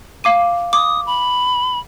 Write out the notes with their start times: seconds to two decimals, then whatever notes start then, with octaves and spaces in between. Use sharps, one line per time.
0.24 F5 D6 D#7
0.73 D6 D#6
1.06 B5